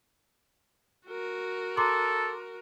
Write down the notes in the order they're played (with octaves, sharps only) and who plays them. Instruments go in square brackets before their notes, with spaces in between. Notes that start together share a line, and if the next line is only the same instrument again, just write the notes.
[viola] F#4 A#4
[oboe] A4 [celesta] A#5 C6 D6